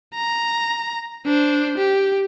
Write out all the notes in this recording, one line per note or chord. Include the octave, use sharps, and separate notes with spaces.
A#5
D4 C5
G4